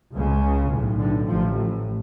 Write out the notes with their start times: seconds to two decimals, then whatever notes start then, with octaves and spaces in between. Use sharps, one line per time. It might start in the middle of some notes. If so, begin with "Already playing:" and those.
0.13 C#2 C#3
0.70 B1 A2
0.99 D3
1.28 A1 F3
1.32 A2